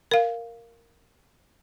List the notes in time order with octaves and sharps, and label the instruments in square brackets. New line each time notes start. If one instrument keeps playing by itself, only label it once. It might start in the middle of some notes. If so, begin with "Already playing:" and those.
[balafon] A#4 F5